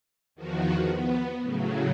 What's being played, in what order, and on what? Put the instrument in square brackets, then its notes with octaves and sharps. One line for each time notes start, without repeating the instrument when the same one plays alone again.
[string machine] E2 D#3 F3 F#4
B3
A2 C#3 F#3